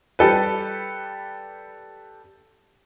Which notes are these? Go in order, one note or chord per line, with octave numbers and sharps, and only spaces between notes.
G3 G4 A4 B4